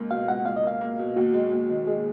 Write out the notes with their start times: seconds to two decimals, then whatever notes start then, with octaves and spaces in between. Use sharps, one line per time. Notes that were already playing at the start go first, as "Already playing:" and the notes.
Already playing: C#2 A#3
0.10 B2 F5
0.28 C#2 F#5
0.45 C#2 F5
0.56 D#5
0.63 A#3 F5
0.81 A#3
0.99 B2
1.16 D#2 F#4
1.34 G#3
1.52 D#2
1.69 D#3
1.87 G#3 G#4